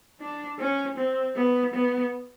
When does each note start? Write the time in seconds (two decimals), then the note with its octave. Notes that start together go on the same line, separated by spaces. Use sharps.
0.20 D4
0.59 C#4
0.97 C4
1.36 B3
1.74 B3